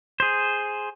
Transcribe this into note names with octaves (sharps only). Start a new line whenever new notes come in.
G#4 C5